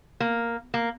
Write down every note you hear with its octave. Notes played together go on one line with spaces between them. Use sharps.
A#3
A#3